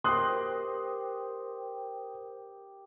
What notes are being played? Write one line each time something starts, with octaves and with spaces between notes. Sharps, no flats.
G4 A#4 C5 D#5 G5 C6 D#6 F#6